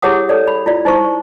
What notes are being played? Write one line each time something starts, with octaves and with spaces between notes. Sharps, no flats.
E4 G4 G#4 C#5 F#5 D#6
A4 C#5 D5
B5
E4 F4 D5
D#4 E4 C5 C#6